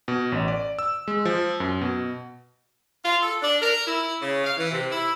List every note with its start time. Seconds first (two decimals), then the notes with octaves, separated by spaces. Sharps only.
0.08 B2
0.32 A1
0.48 D5
0.79 E6
1.08 G#3
1.25 F3
1.60 F#2
1.81 B2
3.04 F4
3.22 A4
3.42 D4
3.60 A#4
3.86 E4
4.21 C#3
4.44 F5
4.57 E3
4.72 C3
4.90 E4